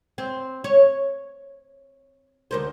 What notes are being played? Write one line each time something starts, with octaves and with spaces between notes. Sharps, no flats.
C4
C#5
D2 A#4 C5